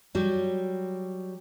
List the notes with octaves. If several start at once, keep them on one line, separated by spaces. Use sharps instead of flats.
F#3 G3